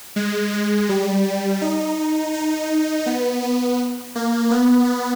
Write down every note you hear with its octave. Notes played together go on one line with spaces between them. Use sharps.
G#3
G#3
G3
D#4
D#4
B3
B3
A#3
B3